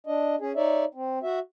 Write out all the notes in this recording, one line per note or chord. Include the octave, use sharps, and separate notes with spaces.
D4 D#5
C#4 G#4
D#4 C#5 D5 E5
C4
F#4 E5